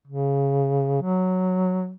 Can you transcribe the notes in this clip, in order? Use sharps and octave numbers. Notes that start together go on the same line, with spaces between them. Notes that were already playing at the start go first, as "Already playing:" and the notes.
C#3
F#3